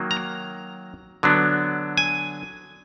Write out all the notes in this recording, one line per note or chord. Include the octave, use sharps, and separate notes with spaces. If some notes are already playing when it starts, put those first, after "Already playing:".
Already playing: D#3 F#3 A#3
A#5
D3 F#3 B3 D4
G#5